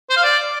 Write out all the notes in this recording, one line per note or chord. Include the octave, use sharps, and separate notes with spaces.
C5
F5
D5